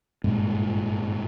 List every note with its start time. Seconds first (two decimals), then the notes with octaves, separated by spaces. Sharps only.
0.24 G#1 G2 A#2 G#3